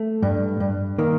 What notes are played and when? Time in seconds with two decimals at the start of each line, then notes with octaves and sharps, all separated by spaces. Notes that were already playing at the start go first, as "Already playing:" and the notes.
Already playing: A3
0.22 G2
0.60 G2
0.98 D#3 A#3